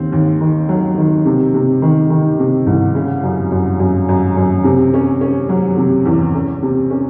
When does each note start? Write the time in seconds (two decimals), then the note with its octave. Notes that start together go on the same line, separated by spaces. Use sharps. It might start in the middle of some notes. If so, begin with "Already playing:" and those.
Already playing: D#2 C4
0.12 D#2
0.41 D#3
0.69 F#3
0.98 D#3
1.25 C3
1.54 C3
1.82 D#3
2.10 D#3
2.39 C3
2.67 C2
2.95 C#3
3.23 F#2
3.51 F#2
3.80 F#2
4.09 F#2
4.37 F#2
4.64 C3
4.94 C#4
5.21 C#4
5.49 F#3
5.78 C3
6.06 E2
6.35 C#4
6.62 C3
6.90 C#4